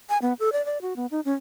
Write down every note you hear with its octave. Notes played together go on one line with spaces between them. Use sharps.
G#5
B3
A4
D5
D5
F#4
B3
D#4
C#4